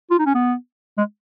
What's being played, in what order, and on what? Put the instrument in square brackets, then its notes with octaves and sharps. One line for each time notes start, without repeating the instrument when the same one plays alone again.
[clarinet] F4
D#4
C#4
B3
G#3